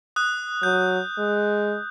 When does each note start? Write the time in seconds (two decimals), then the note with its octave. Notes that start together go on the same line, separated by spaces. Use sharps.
0.16 D#6 F#6
0.63 F#3 G6
1.19 G#3